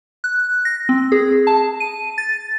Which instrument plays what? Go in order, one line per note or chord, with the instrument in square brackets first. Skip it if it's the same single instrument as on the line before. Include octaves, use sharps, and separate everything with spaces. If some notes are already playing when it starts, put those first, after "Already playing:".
[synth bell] F#6
A#6
C4
G#4
A5
D#7
A6